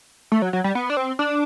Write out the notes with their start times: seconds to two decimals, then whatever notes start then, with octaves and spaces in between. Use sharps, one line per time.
0.32 A3
0.42 F#3
0.53 F#3
0.64 G3
0.75 B3
0.90 D4
0.97 C4
1.19 D4